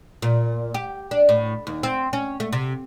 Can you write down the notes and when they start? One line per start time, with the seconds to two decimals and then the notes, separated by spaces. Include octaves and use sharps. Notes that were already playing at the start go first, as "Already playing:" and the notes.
0.22 A#2
0.74 G4
1.11 D4
1.29 A2
1.67 D#2
1.83 C4
2.13 C#4
2.40 A3
2.53 C3